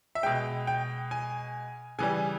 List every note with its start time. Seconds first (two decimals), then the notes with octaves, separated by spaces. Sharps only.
0.15 E5
0.23 B2 G#3 G5
0.67 G5
1.11 G#5
1.99 C#3 E3 G3 G#5